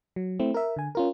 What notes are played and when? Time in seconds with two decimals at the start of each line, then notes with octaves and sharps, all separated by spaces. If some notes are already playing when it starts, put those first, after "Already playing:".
0.16 F#3
0.39 A3 C4 E4
0.54 A#4 E5
0.77 D3 G#5
0.95 C#4 F4 A#4